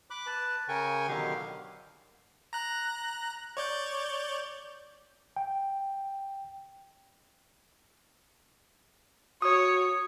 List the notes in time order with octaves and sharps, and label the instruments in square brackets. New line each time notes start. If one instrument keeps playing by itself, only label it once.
[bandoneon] B5 D6 F#6
B4 A5
C#3 A#4 G5 G#5 C#6
B2 D3 D#3 F#3 G4 F5
[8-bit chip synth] A#5 F#6
C#5 D5 G6
[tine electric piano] G5
[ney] F#4 [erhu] C#5 [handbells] D#6